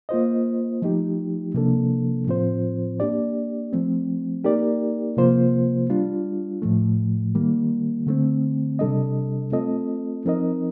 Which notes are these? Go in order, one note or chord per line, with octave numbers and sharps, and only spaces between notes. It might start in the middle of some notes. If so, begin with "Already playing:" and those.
A#3 F4 C5 D#5
F3 A3 D#4 G4
C3 F3 A#3 D4 A4
A2 F3 C4 F4 C5
A#3 D4 G4 D5
F3 A3 C4
A#3 D#4 G4 A#4 D5
C3 F3 A#3 F4 C5
G3 D4 F4
A2 F3 A3
D#3 G3 A#3
D3 A3 C4
C3 G3 D4 A4 D#5
A3 C4 F4 A4 D#5
F3 C4 D#4 A#4 D#5